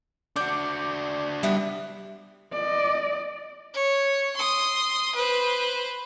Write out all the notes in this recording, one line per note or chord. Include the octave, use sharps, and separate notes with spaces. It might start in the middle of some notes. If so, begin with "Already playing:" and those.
D4 F#4 D5 D6 G6
G3 B3 E4
D5 D#5
C#5
C6 D#6
B4 C5